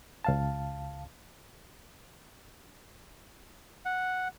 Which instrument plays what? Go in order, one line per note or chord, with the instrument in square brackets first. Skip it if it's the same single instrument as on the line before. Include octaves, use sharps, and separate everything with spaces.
[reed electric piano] C#2 F5 A5
[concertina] F#5